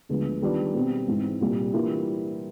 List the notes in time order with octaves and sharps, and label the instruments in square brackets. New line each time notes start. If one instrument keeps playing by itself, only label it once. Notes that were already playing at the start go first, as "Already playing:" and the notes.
[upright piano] D2 D3 F3 G#3 B3
D#3 G3 B3 D4 F4
B2 G3 C4
G#2 E3 G#3 C4
C2 A#2 G3
E3 G3 A#3 D4 F4